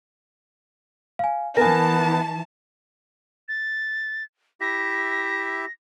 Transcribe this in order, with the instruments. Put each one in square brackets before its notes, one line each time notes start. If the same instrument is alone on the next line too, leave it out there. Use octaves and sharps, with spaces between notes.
[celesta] F5 G#5
[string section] E3 A5 [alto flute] B3 [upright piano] A#4 G#5 [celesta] A#6
[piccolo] A6
[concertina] E4 G4 E5 [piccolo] A#6